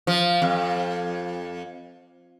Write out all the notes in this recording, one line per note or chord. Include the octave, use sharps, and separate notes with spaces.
F3
F2